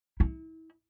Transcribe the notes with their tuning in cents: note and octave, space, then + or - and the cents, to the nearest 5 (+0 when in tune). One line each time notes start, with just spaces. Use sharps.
E4 -35